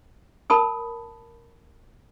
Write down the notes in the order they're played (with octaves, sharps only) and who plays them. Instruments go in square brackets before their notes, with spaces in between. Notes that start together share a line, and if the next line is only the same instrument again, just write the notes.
[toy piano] A#4 A5 B5 D#6